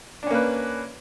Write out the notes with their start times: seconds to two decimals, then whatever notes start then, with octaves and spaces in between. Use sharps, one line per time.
0.23 D4
0.27 C#4
0.31 A#3
0.34 B4